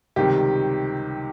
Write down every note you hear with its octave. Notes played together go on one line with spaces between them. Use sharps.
C#2 C3 D#3 G3 G4